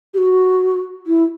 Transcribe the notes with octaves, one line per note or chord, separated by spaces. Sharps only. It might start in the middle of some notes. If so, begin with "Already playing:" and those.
G4
F#4
E4